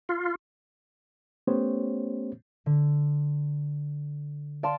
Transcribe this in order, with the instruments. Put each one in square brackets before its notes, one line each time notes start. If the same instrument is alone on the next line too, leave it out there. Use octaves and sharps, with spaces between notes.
[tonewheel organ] F4
[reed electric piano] A3 B3 C#4 G4 C5 C#5
[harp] D3
D5 F5 A5 C6